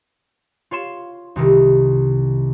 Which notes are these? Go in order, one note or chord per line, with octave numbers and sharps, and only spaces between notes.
F4 C#5 C6 E7
C2 C3 D#3